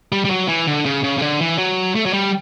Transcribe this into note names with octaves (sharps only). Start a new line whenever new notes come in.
G3
G3
F#3
E3
D3
C#3
C#3
C#3
D3
E3
F#3
A3
F#3
G3